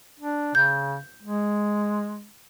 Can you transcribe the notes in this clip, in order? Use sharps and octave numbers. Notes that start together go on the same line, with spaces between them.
D4
C#3 G6
G#3